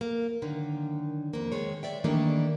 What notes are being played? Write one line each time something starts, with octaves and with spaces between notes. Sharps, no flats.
A#3
F#2 D3 D#3
F2 A#3
G#2 D#3 G#3 C#5
D5 E5 G5
D#3 E3 G3 A3 A#3 D4